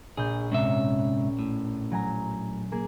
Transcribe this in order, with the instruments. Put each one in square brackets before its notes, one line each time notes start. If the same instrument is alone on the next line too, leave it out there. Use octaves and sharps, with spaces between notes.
[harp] A#1 G6 [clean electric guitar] G#4
[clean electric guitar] G#2 C3 E5 [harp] C#4
[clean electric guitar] A2
[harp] F#3 G#5 A#5
A#3 G#4